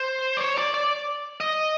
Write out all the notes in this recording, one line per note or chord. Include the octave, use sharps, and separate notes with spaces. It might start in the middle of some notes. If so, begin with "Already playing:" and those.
Already playing: C5
D5
C#5
D5
D5
D#5